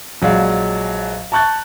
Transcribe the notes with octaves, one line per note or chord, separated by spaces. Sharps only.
A#1 F#3 G#3 D5 F5
A5 A#5 C#6 F#6 G6 A6